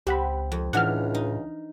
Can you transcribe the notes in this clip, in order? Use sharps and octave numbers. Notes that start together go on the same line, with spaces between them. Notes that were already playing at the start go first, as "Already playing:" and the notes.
C#2 C4 G4 F#5 B5
F2
C#2 A2 E3 D4 F#5 F6
D#4